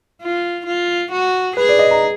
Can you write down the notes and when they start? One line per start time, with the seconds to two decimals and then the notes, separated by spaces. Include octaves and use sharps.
0.22 F4
0.67 F4
1.12 F#4
1.57 G#4 B4
1.69 D5
1.79 D#5
1.91 A#5